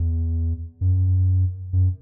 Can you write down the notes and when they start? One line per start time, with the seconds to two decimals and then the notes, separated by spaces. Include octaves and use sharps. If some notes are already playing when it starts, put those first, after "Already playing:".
Already playing: E2
0.81 F#2
1.73 F#2